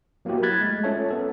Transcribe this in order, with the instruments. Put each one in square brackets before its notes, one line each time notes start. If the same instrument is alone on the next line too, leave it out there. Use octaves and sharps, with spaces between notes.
[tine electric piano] F#3 A#3 B3 E4 F#4 G4
B5 F6 F#6 G#6 A6 B6
G#3 A3
C#4 F4 A4 C#5 E5 A5
B3 A4